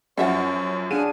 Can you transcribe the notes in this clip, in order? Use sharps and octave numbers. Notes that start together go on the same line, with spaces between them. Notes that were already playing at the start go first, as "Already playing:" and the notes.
F#2 F3 C#4 C#5 E5 F#5
D4 G#4 F5 F#5 G#5 D#7